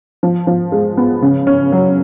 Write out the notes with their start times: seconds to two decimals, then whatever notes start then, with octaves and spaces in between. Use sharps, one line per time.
0.23 F3
0.47 F3
0.72 G#3
0.97 B3
1.22 C#3
1.47 C#4
1.72 F#3